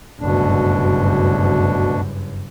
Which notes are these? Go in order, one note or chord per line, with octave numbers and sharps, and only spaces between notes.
F#1 D2 G2 B2 D4